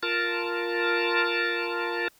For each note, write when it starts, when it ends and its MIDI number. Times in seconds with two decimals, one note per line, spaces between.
0.03 2.08 65
0.03 2.08 70
0.03 2.08 81